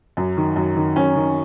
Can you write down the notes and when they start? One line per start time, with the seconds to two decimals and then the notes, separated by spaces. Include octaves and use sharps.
0.17 F#2
0.37 D#3
0.56 F#2
0.76 D#3
0.96 F#2 C#4
1.16 D#3